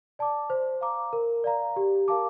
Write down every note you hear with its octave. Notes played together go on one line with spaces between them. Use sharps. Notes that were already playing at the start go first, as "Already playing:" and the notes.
D5 A5 D6
C5
F5 A#5 D6
A#4
D5 F5 A#5
G4
A#4 F5 A5 D6